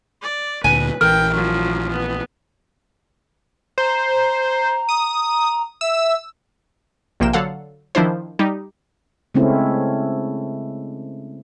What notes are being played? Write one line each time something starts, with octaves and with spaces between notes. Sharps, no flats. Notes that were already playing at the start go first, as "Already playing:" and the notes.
D5
D2 A#2 D3 B4 G#5
A#1 E3 A#4 G5 F6
F3 F#3
B3
C5 A#5
D#6
E5 E6
A#1 C3 A#3 G5 E7
D3 F#3 A4 F5 F#5
D#3 F3 D4 E4 C5
G3 D#4 G4
C#3 G#3 A3 C4 C#4 E4